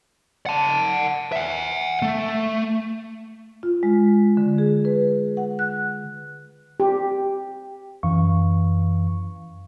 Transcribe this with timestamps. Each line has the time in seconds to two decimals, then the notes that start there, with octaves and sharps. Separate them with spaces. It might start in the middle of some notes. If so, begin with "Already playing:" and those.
0.46 F#5 A5
1.32 E5 F#5
2.02 A3
3.63 F4
3.83 G#3
4.37 D3
4.58 G#4
4.85 B4
5.37 F#5
5.59 F#6
6.80 G4
8.03 F#2 E3 F5 C#6